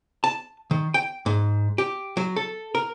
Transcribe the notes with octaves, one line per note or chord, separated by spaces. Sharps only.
A5
D#3
G5
G#2
G4
F#3
A4
A#4